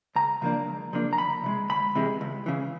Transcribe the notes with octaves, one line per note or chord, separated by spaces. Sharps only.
C#2 A#5
C#3 F3 A#3 D4
C#2
C#3 F3 A#3 D4
A#5
D2 B5
C3 E3 G#3
D2 B5
C3 E3 G#3
C#2
C#3 E3